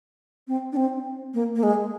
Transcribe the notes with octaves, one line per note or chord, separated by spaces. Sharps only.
C4
D4
C4
A#3
A#3
G#3